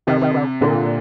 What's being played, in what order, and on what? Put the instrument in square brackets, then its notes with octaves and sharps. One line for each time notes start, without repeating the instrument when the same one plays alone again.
[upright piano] C3 [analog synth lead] D#3
[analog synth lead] D#3
D3
[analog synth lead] A#2 [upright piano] D3